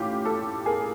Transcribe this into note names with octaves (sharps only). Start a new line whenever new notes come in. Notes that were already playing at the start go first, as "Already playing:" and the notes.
Already playing: A1 A2 C#4 F4 G4
G4 A4
G#4 A#4